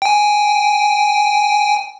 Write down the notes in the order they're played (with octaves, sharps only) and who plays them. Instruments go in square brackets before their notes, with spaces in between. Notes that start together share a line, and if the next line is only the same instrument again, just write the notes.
[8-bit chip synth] G5 G#5